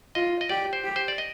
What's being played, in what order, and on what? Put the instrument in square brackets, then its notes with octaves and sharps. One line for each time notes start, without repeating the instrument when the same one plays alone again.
[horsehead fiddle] F4 [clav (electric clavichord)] D#5
[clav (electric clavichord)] D#5
[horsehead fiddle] G4 [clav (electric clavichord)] D5
[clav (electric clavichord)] C5
[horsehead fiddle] G4
[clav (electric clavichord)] C5
D5
D#5